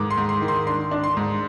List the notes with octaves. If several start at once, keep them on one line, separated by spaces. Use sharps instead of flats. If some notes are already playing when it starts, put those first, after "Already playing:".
Already playing: G#2 D#3 G#3 D6
C6
G#2
C6
D#3
C6
D4 C6
D4
C6
G#2